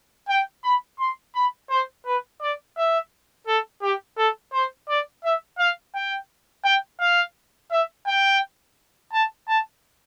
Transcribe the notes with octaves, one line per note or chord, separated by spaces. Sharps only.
G5
B5
C6
B5
C5
B4
D5
E5
A4
G4
A4
C5
D5
E5
F5
G5
G5
F5
E5
G5
A5
A5